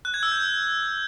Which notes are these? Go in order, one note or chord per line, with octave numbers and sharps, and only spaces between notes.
F#6
G#6
E6
G6